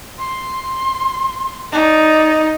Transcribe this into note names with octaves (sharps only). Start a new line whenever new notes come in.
C6
D#4 D5